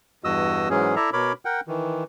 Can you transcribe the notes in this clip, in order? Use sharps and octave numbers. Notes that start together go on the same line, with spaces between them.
E2 G2 F#4 D#5 D#6 E6
G#2 E3 F#3 G#3 C#4 G#4
E4 A4 D5 E5 A#5
B2 A#4 C#5 B5 D6
A#4 F#5 G5
D#3 E3